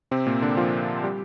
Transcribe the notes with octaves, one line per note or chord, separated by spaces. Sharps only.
C3 C4
A#2 A#3
D3 D4
F3 F4
G3 G4